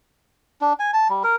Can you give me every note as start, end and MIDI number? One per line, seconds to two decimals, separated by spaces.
0.61 0.73 62
0.79 0.91 80
0.94 1.08 81
1.10 1.23 55
1.24 1.36 70